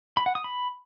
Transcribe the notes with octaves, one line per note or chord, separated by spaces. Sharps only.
B5
F#5
D#6
B5